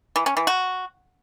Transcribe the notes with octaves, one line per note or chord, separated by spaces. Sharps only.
E3
C#4
E3
F#4